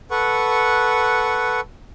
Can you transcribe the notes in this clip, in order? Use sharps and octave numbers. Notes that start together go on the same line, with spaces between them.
A4 B4 F#5 C#6